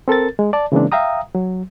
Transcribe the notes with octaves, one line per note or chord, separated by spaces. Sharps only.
C4 A4 A#4 A6
G#3
D5 A5
C#3 E3 G#3 A#3 C4 D4
E5 F5 G5 A#5 D#6
F#3